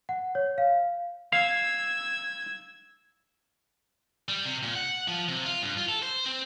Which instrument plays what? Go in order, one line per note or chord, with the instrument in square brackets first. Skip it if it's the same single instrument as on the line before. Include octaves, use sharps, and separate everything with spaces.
[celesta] F#5
C#5
F5
[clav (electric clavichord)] F5 [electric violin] E6 G#6
[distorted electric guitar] G3
C3
A#2
F#5
F3
C3
F4
G2
F4
A4
C5
C4